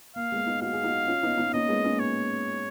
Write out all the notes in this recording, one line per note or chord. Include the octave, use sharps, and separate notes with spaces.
A#3 F5
G#3 B3
B3 D#4
F#4 F5
G#4
D#4 F#4
C#4 F4
B3 D#4
B3 D#4
A#3 C#4 D#5
G#3 B3
A#3 C#4
C#5